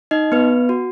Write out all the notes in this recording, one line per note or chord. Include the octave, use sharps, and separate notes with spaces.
D#4 D#5
B3 B4
F#4